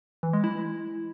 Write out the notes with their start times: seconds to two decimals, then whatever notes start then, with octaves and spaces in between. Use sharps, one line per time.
0.23 E3
0.33 G#3
0.44 E4